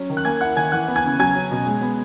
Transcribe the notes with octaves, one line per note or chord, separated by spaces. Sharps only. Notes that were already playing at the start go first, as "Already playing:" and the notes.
Already playing: F#3 C#4
D#3
F#6
A#3 G#5 G#6
E4 F#5 F#6
D#3 G#5 G#6
E3 F#5 F#6
B3
G#5 G#6
C#3
F#3 G#5 G#6
C#4
B2
G#3
B3